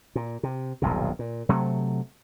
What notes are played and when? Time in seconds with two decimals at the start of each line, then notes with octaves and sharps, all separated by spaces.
0.15 A#2
0.43 C3
0.82 D#1 B1 G2 C3
1.19 A#2
1.49 C3 F#3 A3